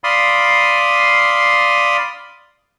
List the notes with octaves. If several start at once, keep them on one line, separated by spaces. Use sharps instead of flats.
D5 F5 B5 C6 D#6